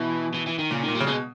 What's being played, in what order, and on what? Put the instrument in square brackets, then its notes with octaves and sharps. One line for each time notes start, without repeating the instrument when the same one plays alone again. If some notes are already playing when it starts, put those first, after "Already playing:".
Already playing: [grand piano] B2 [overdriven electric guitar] E3
[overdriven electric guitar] E3
E3
D#3
[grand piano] A#2 [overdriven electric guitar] C#3
[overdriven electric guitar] D#3
[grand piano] A#2
[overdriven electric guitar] G3
[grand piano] C#3
[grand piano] B2 [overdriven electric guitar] G#3